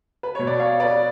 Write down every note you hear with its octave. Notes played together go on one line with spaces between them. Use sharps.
B4
B2 C#5
D5
C#5 F5
B4 D5